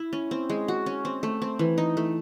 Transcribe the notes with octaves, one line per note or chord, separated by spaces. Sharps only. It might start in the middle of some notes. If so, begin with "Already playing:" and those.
Already playing: E4
C#4
C4
G#3
F#4
C#4
C4
A3
C4
E3
D#4
A3